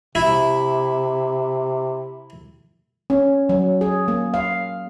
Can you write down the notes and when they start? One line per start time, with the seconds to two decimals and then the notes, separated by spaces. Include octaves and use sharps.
0.15 C3 E4
3.10 C#4
3.49 F#3
3.81 G#4
4.08 A#3
4.34 F5